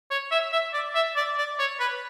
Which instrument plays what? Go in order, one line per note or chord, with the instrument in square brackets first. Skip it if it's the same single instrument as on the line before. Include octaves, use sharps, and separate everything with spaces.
[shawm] C#5
E5
E5
D5
E5
D5
D5
C#5
B4